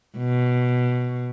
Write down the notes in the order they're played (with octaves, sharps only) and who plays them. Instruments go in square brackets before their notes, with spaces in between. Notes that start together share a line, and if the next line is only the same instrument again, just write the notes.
[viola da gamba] B2